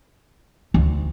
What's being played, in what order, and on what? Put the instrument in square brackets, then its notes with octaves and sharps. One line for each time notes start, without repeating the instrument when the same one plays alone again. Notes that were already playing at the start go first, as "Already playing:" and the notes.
[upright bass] D2